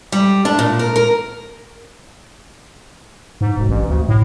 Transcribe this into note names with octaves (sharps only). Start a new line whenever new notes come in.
G3
D4
A#2
A#4
A#4
G#2
E1
A1
D2
A2